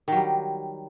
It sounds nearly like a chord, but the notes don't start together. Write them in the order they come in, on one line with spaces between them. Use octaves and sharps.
D#3 F#3 G3